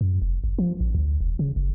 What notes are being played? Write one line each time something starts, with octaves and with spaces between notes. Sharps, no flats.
F#2
F1
G1
F3
A1
D2
E1
C#3
F#1